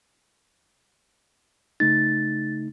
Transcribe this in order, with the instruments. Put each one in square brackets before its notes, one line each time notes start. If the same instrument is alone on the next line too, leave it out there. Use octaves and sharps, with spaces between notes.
[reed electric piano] C#3 A3 D#4 [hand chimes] A6